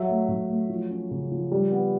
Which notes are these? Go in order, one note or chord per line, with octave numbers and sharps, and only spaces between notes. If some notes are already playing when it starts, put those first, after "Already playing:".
Already playing: F#3 E5
A3
F#3
A3
F3
C#4
C#3
F3
G3
B3